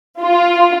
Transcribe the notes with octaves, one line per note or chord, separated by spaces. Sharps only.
F4